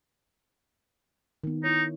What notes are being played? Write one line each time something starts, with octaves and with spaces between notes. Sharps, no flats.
D#3 B3
D#4 E4 C#5